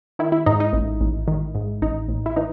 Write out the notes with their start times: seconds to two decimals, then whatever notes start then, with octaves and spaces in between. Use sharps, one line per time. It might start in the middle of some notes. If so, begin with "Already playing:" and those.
0.19 D#3 E4
0.32 E4
0.46 G#2 D#4
0.60 D#4
0.73 A1
1.01 A1
1.28 D#3
1.55 G#2
1.82 A1 D#4
2.09 A1
2.26 E4
2.36 E3 D#4